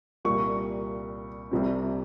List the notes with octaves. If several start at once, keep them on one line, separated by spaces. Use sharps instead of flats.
C2 A#2 G3 A#3 C#6
C2 C3 G3 C4